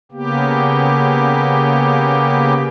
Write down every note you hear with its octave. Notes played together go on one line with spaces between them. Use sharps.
C#3 A#3 B3 G4